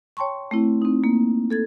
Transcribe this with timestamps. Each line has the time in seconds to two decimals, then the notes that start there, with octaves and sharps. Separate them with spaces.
0.17 C#5 G5 A5 C6 C#6
0.51 A3 C4 E4
0.82 C4 D#4
1.04 A#3
1.50 A4 G#6 A6